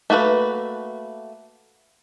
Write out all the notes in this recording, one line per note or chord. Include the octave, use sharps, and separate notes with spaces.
A3 A#3 F#4 G#4 B4